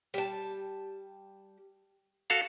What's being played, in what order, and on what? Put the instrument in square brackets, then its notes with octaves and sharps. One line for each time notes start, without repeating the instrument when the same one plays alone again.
[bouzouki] G3 A5
[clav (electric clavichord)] F#4 A4 F5